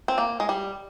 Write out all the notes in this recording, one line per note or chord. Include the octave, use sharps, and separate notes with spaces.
C4
A#3
G#3
G3